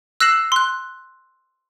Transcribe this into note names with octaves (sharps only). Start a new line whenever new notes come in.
E6 F#6 A#6 C7 E7 F#7
C6 F#6